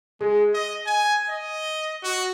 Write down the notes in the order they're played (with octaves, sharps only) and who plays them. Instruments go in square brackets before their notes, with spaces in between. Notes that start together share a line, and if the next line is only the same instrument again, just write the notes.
[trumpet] G#3 [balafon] G#4
[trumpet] D#5
G#5
D#5
F#4